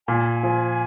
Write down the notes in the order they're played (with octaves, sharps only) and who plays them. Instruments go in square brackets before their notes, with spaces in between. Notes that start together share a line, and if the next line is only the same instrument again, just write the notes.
[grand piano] A#2 [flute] G#5
[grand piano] F3